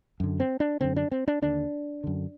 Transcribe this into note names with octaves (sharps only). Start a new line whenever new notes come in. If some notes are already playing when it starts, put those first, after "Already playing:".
F#2 D3
C4
D4
F#2 D3 C4
D4
C4
D4
D#2 D3 D4
F#2 D3